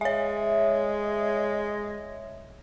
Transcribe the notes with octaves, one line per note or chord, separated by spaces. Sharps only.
G#3 C#5 E5